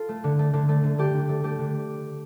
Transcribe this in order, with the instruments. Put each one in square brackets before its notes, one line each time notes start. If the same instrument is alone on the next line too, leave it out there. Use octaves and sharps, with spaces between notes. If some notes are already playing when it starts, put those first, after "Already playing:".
Already playing: [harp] F4 A4
A3
D3
A3
D3
A3
D3
A3 G4
D3
A3
A3 G4
D3